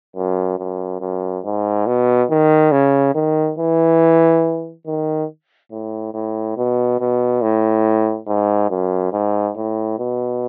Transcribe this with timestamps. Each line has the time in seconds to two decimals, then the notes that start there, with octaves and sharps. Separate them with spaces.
0.16 F#2
0.59 F#2
1.01 F#2
1.45 G#2
1.86 B2
2.30 D#3
2.72 C#3
3.15 D#3
3.58 E3
4.86 D#3
5.72 A2
6.14 A2
6.57 B2
7.00 B2
7.42 A2
8.27 G#2
8.70 F#2
9.13 G#2
9.56 A2
9.99 B2